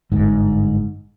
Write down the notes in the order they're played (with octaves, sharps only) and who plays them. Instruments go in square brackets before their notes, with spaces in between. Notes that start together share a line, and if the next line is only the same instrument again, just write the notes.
[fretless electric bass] G1 G#2